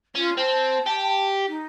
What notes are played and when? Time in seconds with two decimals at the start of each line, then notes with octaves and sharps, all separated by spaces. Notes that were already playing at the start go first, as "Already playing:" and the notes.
0.15 C#4 F4
0.38 C4 A5
0.86 G4
1.48 D#4